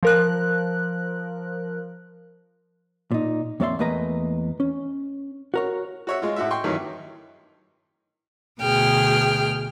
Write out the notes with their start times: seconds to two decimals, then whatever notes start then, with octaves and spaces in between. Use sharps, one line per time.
0.03 F3 A#4 F#6
3.12 A#2 D#4
3.60 F2 A#3 C#5 D5 E5 C6
3.79 E2 A3 A#3 B4 D#5 A#5
4.60 C#4
5.54 F#4 A#4 C#5
6.07 F#4 C#5 E5
6.22 G#3 F4
6.36 A2 F#4 E5
6.51 G5 C6 C#6
6.64 G2 D#3 E3 F#3
8.62 D2 B2 G#4 G5 F6